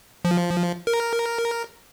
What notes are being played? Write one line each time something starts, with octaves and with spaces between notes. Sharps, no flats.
F3
A#4